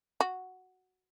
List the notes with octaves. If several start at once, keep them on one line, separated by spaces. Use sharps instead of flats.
F#4